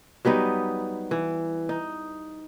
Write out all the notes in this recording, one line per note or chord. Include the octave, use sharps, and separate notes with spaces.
F#3 G3 B3 D#4
E3
D#4